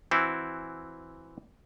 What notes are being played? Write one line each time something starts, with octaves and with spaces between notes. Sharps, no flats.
E3 C4 E4 F#4